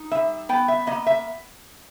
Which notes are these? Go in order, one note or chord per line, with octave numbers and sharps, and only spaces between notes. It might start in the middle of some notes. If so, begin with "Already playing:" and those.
Already playing: D#4
G3 E5
B3 G5
E5
A#3 D#5
E5